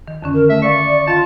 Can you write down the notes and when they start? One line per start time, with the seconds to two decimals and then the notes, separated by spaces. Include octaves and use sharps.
0.08 D#3
0.22 F2 D3 C#4
0.34 A#4
0.50 A3 E5
0.62 D5 E5 F5 C#6
1.07 D#3 F4 F5 A5